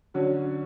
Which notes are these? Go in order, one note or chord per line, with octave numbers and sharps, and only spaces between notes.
D3 F#3 C#4 F#4